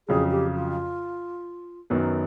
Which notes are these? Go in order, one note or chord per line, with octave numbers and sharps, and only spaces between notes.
F2 C#3 F#3 G#4
G4
F4
F#2 D#3 F#3 B3